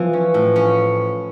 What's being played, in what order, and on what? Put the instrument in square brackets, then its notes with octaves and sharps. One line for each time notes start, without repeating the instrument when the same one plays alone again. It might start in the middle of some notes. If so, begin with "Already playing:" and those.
Already playing: [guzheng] E3 [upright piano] F3
[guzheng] C#4
A2
C#4